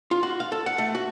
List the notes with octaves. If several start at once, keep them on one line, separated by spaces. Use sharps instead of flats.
F4
F#4
F5
A4
F#5
A3
F#4